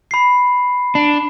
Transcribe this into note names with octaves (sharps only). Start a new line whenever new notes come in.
B5 C7
D4